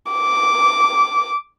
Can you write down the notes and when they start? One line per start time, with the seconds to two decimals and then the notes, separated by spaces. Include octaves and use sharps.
0.12 D6